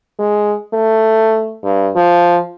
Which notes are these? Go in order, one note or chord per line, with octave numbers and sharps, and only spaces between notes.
G#3
A3
G2
F3